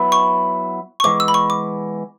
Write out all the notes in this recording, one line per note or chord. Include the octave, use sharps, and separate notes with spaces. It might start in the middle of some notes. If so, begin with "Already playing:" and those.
Already playing: F#3 B3 E4
C#6
C#6
E3 G#3 B3 D6
E6
B5
C#6
D6